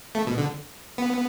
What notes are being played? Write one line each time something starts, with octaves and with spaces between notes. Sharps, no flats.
A3
B2
D3
B3